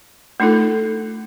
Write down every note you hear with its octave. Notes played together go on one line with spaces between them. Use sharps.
A3 D4 D#4 F4 A4